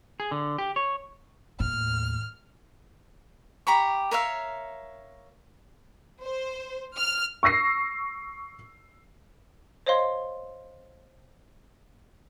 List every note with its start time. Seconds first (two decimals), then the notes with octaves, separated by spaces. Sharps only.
0.20 G#4
0.31 D3
0.58 G4
0.76 C#5
1.60 D#2 A2 F6
3.67 G4 A#5 B5 C#6
4.11 A#4 C#5 E5 F5
6.22 C5
6.96 F6
7.43 C#6 E6 A#6 C7
9.86 C5 C#5 D#5 F5 C6